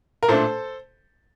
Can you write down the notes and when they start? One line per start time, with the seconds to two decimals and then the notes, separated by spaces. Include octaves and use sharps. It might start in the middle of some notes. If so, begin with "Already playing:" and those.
0.23 A#4
0.28 A#2 A3 D4 A4 C5